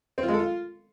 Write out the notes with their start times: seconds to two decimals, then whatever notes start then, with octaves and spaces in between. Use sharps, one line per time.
0.18 C4
0.23 F4
0.28 G#3
0.34 A4
0.39 F4